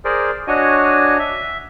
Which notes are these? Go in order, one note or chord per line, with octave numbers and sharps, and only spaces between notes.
G#4 A#4 C5 D5
D4 F#4 C#5 D#5 G#5
E5